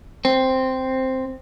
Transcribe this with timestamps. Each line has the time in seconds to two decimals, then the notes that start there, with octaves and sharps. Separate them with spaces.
0.25 C4